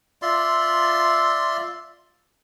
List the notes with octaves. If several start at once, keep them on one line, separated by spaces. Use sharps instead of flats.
F4 D5 E5 C6